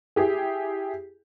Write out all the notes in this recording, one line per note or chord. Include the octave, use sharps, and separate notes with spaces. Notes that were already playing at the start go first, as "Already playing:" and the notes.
E4 G4 G#4